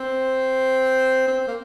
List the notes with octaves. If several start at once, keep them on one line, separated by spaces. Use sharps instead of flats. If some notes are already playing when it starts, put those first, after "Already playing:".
Already playing: C4
C4
A#3